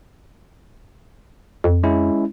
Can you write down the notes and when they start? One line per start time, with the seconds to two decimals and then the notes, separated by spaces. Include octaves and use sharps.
1.64 F2
1.83 G#3 C#4 E4